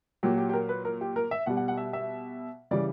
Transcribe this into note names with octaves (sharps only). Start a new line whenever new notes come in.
A#2 F#3 G4
G4
G4
A#4
B4
A#4
G4
A#4
E5
B2 G3 F#5
F#5
F#5
E5
E5
C#3 E3 G3 D5